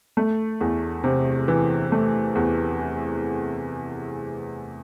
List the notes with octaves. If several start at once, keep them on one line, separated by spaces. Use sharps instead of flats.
A3
E2
C3
E3
A3
E2